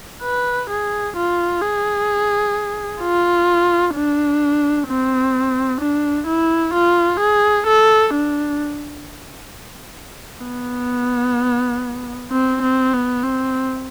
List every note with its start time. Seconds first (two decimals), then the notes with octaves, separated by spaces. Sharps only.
0.23 B4
0.70 G#4
1.17 F4
1.62 G#4
3.01 F4
3.94 D4
4.88 C4
5.81 D4
6.27 E4
6.74 F4
7.19 G#4
7.66 A4
8.13 D4
10.45 B3
12.30 C4
12.62 C4
12.93 B3
13.23 C4